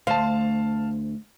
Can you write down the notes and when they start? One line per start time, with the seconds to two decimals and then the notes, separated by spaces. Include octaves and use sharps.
0.07 D2 C5 F5 A5